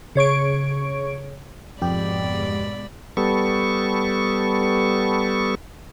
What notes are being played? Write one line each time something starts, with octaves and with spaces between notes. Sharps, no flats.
C#3 C#5 C#6 D7
F2 G#2 B2 G#3 G4 D5 B5
G3 B3 A4 C#6